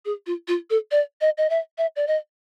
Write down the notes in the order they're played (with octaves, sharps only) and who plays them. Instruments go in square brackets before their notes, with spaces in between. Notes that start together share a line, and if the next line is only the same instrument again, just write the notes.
[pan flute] G#4
F4
F4
A4
D5
D#5
D#5
E5
E5
D5
D#5